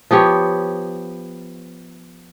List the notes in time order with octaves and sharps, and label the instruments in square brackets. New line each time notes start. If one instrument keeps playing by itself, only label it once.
[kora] F3 B3 G4 C#5